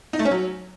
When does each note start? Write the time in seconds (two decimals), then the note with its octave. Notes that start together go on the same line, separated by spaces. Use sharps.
0.13 D#4
0.19 A3
0.25 C#4
0.31 F#3